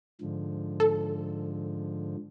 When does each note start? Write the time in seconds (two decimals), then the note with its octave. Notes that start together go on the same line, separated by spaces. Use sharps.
0.21 G#2 D3 F3
0.80 A4